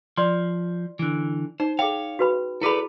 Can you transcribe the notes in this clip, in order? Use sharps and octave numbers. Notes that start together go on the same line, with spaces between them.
F3 D5 C6
D3 E3
D#4 C5
G#4 C#5 F5 G5
F#4 B4 B5
E4 G#4 A4 B4 D5 B5